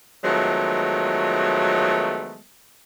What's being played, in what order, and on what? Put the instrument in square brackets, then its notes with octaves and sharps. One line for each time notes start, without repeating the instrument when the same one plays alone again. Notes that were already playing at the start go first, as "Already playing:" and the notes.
[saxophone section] D#3 F3 F#3 G#3 A3 B3